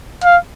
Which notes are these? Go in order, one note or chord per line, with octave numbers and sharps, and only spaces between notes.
F5